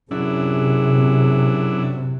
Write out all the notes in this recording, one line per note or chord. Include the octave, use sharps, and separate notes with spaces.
F#2 C3 F#3 D4 E4 G#4